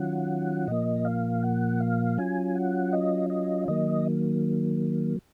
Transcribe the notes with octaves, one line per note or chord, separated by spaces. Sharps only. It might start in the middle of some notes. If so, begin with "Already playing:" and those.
Already playing: D#3 F#3 C#4 F4 F#5
A#2 F3 A#3 D#5
F5
F#5
F5
F#3 C#4 F4 G#5
F#5
D#5
D#5
D#3 F#3 A#3 D#5